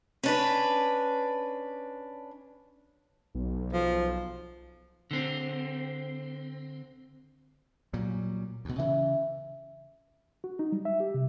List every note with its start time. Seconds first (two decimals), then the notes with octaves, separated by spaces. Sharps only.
0.23 C#4 D4 B4
3.35 B1
3.73 F3
5.11 D3 C4
7.93 A#2 F#3 G3
8.65 D2 B2
8.79 C#3 E3 E5
10.44 F#4
10.59 D#4
10.72 G3
10.85 E5
11.00 G4
11.14 C3